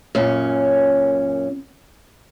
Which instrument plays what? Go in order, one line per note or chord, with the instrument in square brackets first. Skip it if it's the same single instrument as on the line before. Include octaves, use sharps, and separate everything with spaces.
[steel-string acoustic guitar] F#2 A#2 C#4